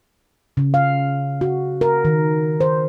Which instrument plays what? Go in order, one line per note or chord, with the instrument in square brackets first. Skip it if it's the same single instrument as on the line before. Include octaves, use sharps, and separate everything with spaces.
[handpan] C#3
F5
F#4
A#4
D#3
C5